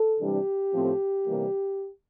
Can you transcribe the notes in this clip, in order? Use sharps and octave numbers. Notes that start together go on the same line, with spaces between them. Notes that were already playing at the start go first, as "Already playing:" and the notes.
Already playing: A4
C3 E3 G3 D4 G4
A2 F3 A3 C4
C3 E3 G3 A#3